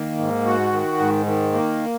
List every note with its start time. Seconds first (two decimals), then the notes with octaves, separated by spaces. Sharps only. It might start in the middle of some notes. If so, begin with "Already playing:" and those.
Already playing: D#3 A#3
0.18 G#2
0.46 F#4
0.72 D#3
0.99 G#2
1.26 D#3
1.53 A#3